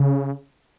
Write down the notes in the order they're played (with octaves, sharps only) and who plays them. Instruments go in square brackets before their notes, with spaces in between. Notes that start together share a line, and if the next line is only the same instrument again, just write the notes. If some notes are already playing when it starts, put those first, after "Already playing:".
Already playing: [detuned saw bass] C#3